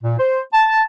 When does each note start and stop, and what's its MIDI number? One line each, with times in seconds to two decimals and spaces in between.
0.04 0.15 46
0.18 0.41 72
0.52 0.81 81